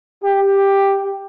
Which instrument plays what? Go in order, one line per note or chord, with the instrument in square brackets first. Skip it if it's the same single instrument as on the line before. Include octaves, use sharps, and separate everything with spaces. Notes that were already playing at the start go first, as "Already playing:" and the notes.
[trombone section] G4